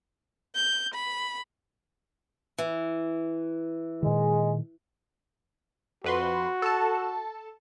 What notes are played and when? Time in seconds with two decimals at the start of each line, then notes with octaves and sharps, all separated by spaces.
0.55 G6
0.94 B5
2.58 E3
4.03 A#2 D#3 G#3
6.04 F2 F#4 B4 C6
6.62 A4 A5